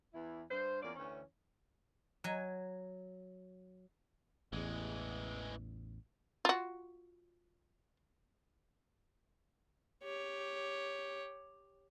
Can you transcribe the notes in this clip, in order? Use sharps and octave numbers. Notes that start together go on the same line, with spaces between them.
E2 E3 E4
G2 C5
E2 A#3 C#4 F4 D5
D2 E3 C#4
F#3 G#5
A1 E2 E3 G#3
F4 F#4
G4 C#5